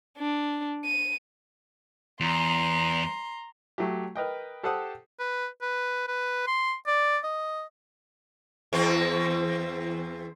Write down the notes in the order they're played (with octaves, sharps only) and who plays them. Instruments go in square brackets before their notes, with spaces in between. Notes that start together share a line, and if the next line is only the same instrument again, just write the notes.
[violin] D4
D#7
[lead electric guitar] E2 [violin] A#5 C6
[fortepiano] F#3 A3 G4
A#4 B4 D#5 G5
G4 A4 C5 F#5 A5 D#6
[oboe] B4
B4
B4
C6
D5
D#5
[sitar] E2 C4